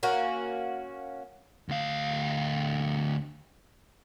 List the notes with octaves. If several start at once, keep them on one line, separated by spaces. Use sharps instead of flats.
A#3 C#4 F#4
D2 F5